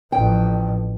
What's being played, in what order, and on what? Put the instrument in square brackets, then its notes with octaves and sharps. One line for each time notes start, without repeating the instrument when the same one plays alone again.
[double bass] A1 F2 [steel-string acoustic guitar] G5